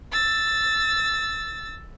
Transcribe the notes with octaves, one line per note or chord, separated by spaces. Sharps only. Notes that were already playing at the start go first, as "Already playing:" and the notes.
E6 A6